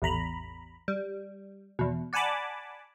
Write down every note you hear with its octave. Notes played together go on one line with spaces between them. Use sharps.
A1 E2 A#5 B5
G3
E2 B2
D5 F#5 G#5 A5 B5 D6